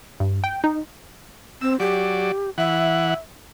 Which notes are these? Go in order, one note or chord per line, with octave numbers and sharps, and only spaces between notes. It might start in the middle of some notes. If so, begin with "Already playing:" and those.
G2
G5
D#4
C4 E6
F#3 G4 D5
E3 E5 F#5